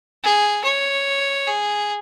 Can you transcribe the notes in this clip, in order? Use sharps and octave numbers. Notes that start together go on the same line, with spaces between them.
G#4
C#5
G#4